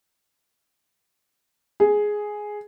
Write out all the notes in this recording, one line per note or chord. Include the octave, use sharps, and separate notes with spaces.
G#4